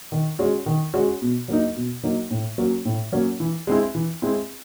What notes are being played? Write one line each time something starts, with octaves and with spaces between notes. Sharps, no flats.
D#3
G#3 C#4 F#4
D#3
G#3 C#4 F#4
B2
F#3 A#3 D#4
B2
F#3 A#3 D#4
A2
F#3 A#3 C#4 F#4
A2
F#3 A#3 C#4 F#4
E3
G#3 C4 E4
E3
G#3 C4 E4